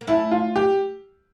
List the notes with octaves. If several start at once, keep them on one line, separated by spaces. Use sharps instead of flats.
A#3
A3 C#4 E4
F4
G4